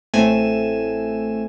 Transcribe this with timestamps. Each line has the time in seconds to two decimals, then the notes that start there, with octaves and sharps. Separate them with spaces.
0.14 A1 A2 A3 C4 G#5 E7